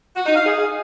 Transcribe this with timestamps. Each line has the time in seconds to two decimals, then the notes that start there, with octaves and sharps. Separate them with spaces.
0.16 F#4
0.26 D#4
0.36 F5
0.46 G#4